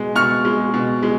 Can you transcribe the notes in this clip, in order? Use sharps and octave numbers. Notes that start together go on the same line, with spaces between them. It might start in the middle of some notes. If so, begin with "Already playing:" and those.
Already playing: B2 G#3
B2 C#6 F6
G#3
B2
G#3